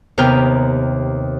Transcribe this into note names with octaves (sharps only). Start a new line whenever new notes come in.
D#2 C3 B3 A#4 G5 F6